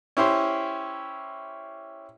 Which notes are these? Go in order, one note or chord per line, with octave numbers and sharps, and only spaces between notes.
C#4 E4 G4 C5